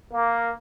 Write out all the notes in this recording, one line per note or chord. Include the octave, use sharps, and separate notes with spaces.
A#3